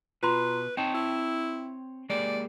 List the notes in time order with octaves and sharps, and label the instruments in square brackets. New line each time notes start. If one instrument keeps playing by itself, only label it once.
[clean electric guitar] B2 [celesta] F4 A#5 C6 [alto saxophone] B4
[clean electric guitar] C4 C#5 A5 [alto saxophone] D#4 [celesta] G5
[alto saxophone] E4
[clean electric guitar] G#3 A#3 G4 [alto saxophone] D5